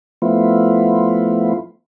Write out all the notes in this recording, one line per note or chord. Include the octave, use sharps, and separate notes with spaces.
F3 A3 B3 E4 F4